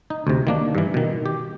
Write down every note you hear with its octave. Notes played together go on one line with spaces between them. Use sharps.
D#4
D2 C3
D#3 A#3 D4
G2 E3
B2 D#3
G4